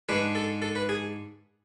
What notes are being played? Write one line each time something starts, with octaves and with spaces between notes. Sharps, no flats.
G#2 G#3 D4 B4
A4
A4
B4
G#4